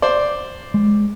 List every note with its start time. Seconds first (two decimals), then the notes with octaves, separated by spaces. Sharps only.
0.02 C5 D5
0.74 G#3